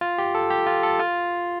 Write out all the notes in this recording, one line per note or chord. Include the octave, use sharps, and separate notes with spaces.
F4
G4
A4
G4
F4
A4
F4